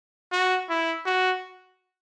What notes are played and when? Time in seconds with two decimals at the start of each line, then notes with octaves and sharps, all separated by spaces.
0.32 F#4
0.70 E4
1.06 F#4